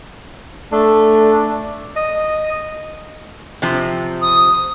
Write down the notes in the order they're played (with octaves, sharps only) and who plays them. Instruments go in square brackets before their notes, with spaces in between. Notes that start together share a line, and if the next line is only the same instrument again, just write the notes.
[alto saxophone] A3 [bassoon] D4
[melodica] D#5
[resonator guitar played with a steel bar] C3 F3
[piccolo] D#6